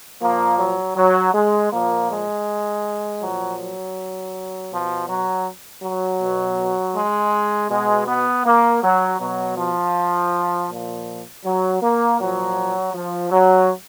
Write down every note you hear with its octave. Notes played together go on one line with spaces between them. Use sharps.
A#2 F3 A#3
F#3
F#3
G#3
A#2 F3 A#3
G#3
A#2 F3 F#3
F#3
B2 F3
F#3
F#3
B2
G#3
B2 G#3
B3
A#3
F#3
B2 F#3
F3
A#2 F3
F#3
A#3
A#2 F3 F#3
F3
F#3